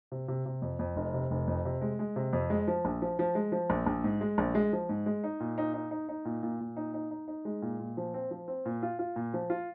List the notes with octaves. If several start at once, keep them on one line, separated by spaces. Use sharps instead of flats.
C3
C3
C3
F2
F2
F1
C3
F1
F2
C3
G#3
G#3
C3
F2
G#3
F3
A#1
F3
F3
G#3
F3
A#1
A#1
G#2
G#3
A#1
G#3
F3
G#2
G#3
D#4
A#2
D#4
D#4
D#4
D#4
A#2
A#2
A#2
D#4
D#4
D#4
D#4
G#3
A#2
A#2
F3
C4
F3
C4
A#2
F4
F4
A#2
F3
F4